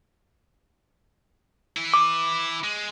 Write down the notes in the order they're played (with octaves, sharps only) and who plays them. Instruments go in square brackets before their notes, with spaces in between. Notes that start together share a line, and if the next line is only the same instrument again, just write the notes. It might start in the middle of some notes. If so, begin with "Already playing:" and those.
[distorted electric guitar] E3 E4
[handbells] D6
[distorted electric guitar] G#3